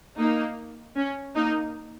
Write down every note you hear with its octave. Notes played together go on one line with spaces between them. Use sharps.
A#3 D#4
C#4
A#3 D#4